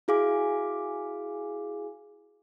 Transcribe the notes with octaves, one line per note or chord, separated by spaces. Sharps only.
E4 F#4 G#4 F5 G#5 D6